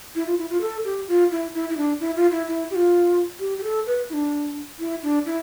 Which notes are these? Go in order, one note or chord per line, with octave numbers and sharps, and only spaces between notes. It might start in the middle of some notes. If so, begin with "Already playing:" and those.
E4
F4
E4
F4
A4
G4
F4
E4
E4
E4
D4
E4
F4
E4
E4
G4
F4
G4
G4
A4
B4
E4
D4
E4
D4
E4